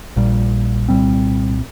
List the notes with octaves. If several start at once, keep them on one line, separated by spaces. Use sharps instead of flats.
A#1 A#2 G3
C2 A#2 G3 C4